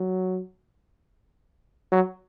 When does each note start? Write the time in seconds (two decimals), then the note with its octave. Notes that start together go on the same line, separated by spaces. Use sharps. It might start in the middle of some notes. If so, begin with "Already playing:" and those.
Already playing: F#3
1.92 F#3